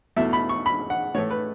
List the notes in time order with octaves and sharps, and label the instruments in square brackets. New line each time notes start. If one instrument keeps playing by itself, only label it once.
[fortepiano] E2 B2 A3 E5
B5
C#6
B5
F#5
A2 E3 A3 C#5
B4